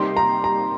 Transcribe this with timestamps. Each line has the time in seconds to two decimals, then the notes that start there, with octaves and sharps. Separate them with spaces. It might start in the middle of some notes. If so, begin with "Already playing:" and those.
Already playing: C3 G3 A#3 D#4 G4 C6
0.17 A#5
0.44 A#5